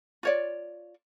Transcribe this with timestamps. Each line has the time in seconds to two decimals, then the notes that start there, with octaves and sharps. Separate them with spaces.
0.23 F4 C#5 D5